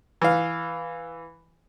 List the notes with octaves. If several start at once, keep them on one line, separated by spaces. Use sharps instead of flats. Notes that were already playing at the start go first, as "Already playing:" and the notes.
E3 F5